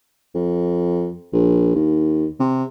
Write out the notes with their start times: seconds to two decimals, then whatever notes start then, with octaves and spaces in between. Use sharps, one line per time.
0.35 F2
1.33 A#1
1.75 D#2
2.40 C3